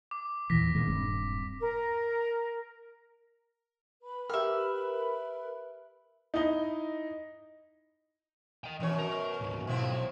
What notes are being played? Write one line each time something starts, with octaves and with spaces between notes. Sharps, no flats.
D6
E2 A#2 E3 A#6 B6
A#2 D#3 G#3
D#1 G2 C4
A#4
B4 B5
G4 A#4 E5 G5 F6
D#4 E4 D#5 G7
D#5 G5
F#2 B2 E3 C#5
A#4
D2 G#2
B1 F3 C4 E4